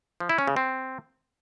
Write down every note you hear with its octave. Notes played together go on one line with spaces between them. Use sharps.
F3
E4
C#4
C#3
C4